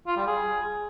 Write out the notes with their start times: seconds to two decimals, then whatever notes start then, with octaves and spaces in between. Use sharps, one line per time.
0.07 F4
0.17 G3
0.27 G#4